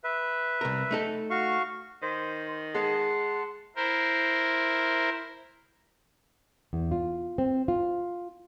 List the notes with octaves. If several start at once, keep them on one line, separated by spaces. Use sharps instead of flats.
B4 E5
C2 A#4
A3 D#4 A4
F#4 F5 C#6
D#3 C5
G#3 F#5 A5 C6
E4 A#4 C5
E2
F4
C4
F4